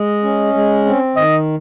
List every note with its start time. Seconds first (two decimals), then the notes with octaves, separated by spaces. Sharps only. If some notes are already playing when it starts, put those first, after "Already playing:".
Already playing: G#3 D#5
0.23 C#4
0.54 G#3
0.85 C4
1.16 D#3 D#5